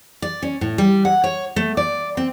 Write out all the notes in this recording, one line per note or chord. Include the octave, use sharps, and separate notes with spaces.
D5
C#4
A2
G3
F#5
C#5
A3
D5
C4